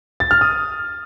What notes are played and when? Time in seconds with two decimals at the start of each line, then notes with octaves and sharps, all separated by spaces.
0.20 A6
0.31 F6
0.41 D#6